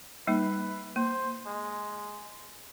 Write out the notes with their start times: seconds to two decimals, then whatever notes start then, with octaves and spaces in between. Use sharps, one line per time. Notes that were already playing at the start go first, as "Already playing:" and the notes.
0.27 G3 A#3 D#4 B4
0.96 A#3 C5
1.46 G#3